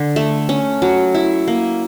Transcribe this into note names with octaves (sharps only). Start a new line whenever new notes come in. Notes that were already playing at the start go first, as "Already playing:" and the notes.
Already playing: D3
A3
C#4
F#3
E4
A#3